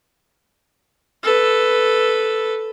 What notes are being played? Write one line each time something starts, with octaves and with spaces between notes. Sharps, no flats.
A4 B4